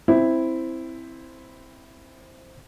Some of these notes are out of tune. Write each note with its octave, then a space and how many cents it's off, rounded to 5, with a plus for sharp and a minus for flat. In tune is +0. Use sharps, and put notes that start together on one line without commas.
C4 +0 E4 +0